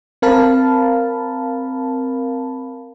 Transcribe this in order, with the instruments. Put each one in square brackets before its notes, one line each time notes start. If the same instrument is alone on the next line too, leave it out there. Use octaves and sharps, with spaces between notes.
[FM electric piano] C4 A#4 F5 A5 B5